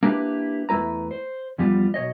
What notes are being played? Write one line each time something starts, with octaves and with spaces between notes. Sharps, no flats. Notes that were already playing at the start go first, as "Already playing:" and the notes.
A#3 D4 E4 G4 B4
E2 A3 E4 B4 A#5
C5
E2 F3 G3 B3 F4
B1 C#5 D#5